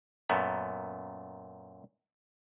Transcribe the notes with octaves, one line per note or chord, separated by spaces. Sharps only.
F#2 A#2 A3 B3